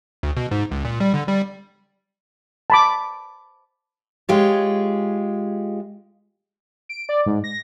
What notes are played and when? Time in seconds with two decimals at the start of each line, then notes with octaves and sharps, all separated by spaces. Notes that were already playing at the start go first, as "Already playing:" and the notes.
0.23 D2
0.37 B2
0.51 G#2
0.71 C#2
0.85 A#2
1.00 G3
1.14 D3
1.28 G3
2.70 A5 B5 D6
4.29 G#3 F4 G4 G#4 C#5
6.89 D7
7.09 D5
7.26 G#2
7.44 A#6